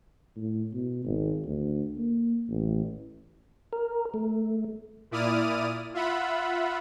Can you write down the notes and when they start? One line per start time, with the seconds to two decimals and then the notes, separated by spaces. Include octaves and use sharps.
0.37 A2
0.73 B2
1.05 G#1
1.45 D2
1.98 A#3
2.49 A1
3.73 A#4
4.14 A3
5.11 A#2 E4 D5 D#6 F6 D#7
5.94 F4 E5 F#5 B5